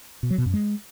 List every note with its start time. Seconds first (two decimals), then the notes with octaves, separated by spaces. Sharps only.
0.23 B2
0.31 F#3
0.38 B2
0.46 F#2
0.54 G#3